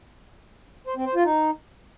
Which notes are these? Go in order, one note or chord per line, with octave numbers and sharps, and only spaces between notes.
C5
C4
C5
F4
D#4